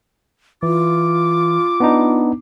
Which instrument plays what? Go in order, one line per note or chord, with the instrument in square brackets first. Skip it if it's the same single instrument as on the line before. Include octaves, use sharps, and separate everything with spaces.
[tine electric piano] E3 [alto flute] F4 [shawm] D6
[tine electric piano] B3 D4 D#4